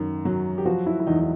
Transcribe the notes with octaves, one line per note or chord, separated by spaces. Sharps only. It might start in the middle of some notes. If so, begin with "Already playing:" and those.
Already playing: F#2 D#3
F#3
G4
F3 F#4
E4
E4
E2 D#4
D#4